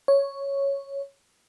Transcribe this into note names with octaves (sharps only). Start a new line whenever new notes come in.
C#5